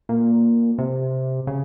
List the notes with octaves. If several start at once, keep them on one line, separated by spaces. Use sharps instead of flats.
A#2
C3
C#3